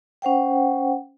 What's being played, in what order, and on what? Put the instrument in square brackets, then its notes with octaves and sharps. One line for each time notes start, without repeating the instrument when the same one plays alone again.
[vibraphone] C#4 C5 F#5 G5